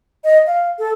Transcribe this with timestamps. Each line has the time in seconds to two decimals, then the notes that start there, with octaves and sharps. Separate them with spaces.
0.24 D#5
0.47 F5
0.79 A4